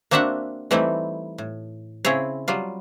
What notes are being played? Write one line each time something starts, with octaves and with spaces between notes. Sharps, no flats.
A#3 C4 D4 F#4 E5 F#5
E3 G3 A3 C4 D#4 E4
A2
C#3 C4 E4 G#4 C#5
F#3 G3 F4